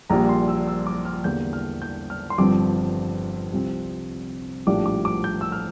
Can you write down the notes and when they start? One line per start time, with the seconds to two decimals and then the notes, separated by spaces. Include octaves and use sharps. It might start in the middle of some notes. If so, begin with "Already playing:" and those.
0.10 A#1 A#2 G3 A#5
0.29 C6
0.48 E6
0.67 E6
0.87 D6
1.05 F6
1.24 E2 D3 G3 A#3 G6
1.53 F6
1.82 G6
2.10 F6
2.30 C6
2.38 G1 G2 F3 C4 D6
3.53 C2 C3 F3 C4
4.66 A#1 A2 G3 D4 F4 D6
4.86 D6
5.05 D6
5.24 G6
5.41 E6
5.52 F6